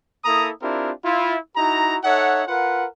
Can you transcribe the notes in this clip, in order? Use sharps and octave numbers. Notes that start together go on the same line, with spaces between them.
A#3 E4 A4 A#5 D#6
C4 D4 E4 F4 G4 A#4
E4 F4
D#4 E4 F#4 A#5
D#4 A4 C#5 E5 F#5
F4 A#4 B4 F#5